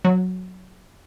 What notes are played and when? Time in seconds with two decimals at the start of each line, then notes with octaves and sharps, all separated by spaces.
0.05 F#3